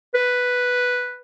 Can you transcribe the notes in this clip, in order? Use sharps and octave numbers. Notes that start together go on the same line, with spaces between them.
B4